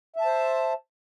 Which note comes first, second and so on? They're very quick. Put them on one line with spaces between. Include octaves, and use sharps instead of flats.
E5 A5 C5